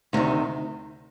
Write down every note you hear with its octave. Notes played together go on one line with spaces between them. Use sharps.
D2 C3 D#3